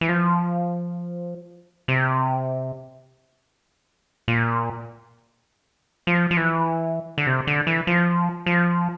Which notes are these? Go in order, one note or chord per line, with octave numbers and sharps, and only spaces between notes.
E3
F3
C3
A#2
F3
F3
E3
D3
C3
D3
E3
F3
F3